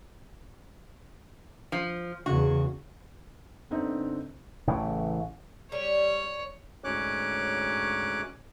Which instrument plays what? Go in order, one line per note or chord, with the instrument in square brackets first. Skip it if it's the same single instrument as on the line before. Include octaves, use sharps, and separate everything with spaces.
[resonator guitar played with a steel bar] F3
[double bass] E2 C#3 [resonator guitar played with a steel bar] F#4
[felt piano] G1 D3 C4 D#4
[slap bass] A1 A2 C#3 E3
[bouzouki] G3 [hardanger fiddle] C#5
[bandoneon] D2 G#2 C#4 C#5 D6 F#6